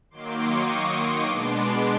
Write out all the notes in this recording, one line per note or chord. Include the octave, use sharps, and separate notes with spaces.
D#3 F#3 A#3 C6 D6
C#6 D#6
B2 G#3 B3 D4 C6 D6